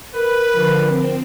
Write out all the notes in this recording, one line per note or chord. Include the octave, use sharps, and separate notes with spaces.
A#4 B4
D3 F3
C4